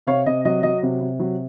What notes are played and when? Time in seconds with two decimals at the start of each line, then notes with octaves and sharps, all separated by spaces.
0.07 C3 C#5 F5
0.26 C3 D#5
0.45 F#3 D#5
0.63 F#3 D#5
0.82 C3
1.01 C3
1.20 F#3